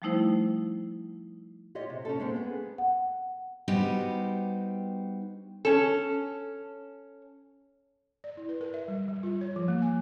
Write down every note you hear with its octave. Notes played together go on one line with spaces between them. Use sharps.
F3 G3 A3 D#4 E4 C5
F4 G4 C#5 D#5
C3
C#4 D#4 A4
G#3 A#3 C4
B3 G#4
F#5
G3 B3 D#4 F#4 G4 C5
C#4 A4
D5
E4
B4
A#4
E5
G3
G3
F4
C#5
F3
A#3
G#5